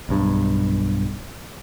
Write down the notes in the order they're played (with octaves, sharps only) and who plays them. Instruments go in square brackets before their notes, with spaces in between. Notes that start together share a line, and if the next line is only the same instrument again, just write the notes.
[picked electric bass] B1 G2